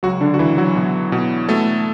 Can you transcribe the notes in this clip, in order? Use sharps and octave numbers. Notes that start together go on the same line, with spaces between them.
C#2 F#3 F#4
D3 D4
F#4
C#2 E3 E4
F#3 F#4
B2
B2
B2 A3 A4